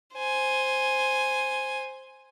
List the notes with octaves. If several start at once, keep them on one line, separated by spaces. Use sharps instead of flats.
C5 G#5